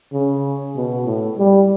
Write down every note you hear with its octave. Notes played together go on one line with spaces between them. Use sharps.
C#3
B2
A2
G3